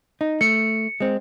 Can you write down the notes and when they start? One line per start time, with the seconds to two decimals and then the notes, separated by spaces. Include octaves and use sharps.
0.21 D#4
0.41 A3 C#7
1.00 G#3 C4